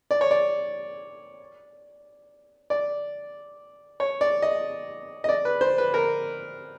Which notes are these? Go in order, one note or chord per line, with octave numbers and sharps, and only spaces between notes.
D5
C#5
D5
D5
C#5
D5
D#5
D#5
D5
B4
C5
B4
A#4